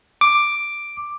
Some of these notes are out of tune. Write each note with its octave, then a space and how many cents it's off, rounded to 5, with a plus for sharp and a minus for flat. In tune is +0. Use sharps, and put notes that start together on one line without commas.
D6 +5